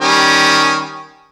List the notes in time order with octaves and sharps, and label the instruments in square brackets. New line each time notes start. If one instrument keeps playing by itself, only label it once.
[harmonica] D#3 G3 C#4